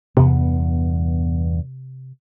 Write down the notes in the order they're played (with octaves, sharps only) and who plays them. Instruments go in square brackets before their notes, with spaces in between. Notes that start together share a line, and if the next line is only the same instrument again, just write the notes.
[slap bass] E2 G2 B3 [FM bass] C3